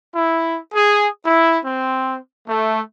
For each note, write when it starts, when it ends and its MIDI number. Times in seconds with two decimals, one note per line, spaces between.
0.14 0.58 64
0.74 1.07 68
1.25 1.60 64
1.63 2.17 60
2.48 2.79 57